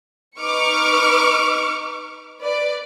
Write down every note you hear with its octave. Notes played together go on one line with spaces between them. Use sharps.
D#4 B4 C#6 D6 F6 C#7
B4 D5